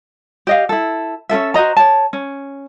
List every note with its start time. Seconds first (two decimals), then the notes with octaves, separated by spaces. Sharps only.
0.47 G4 D#5 F5
0.69 E4 A4
1.29 C#4 F4 A4 E5
1.54 F#4 C5 D#5 A#5
1.77 C#5 A5
2.13 C#4